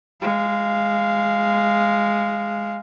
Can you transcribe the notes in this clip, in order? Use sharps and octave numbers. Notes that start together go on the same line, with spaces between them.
G#3 F5